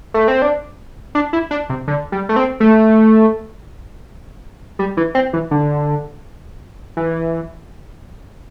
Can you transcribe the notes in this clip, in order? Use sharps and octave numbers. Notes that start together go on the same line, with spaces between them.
A3
C4
D4
D4
E4
D4
C3
D3
G3
A3
C4
A3
G3
E3
C4
E3
D3
E3